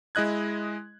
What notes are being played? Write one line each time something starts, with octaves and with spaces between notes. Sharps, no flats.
G#3 E4 D#5 F#6 G#6